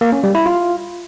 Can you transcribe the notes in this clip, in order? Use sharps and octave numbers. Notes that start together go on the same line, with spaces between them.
A#3
C#4
G3
E4
F4